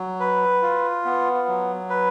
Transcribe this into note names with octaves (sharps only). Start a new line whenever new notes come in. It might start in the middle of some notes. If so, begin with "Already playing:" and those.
Already playing: F#3
B4
F4
B3
F#3
B4